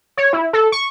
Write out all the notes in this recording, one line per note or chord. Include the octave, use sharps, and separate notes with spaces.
C#5
E4
A4
C#6